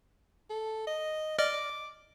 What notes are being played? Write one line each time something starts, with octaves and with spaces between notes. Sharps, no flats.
A4
D#5
D5 D#5 D6 F6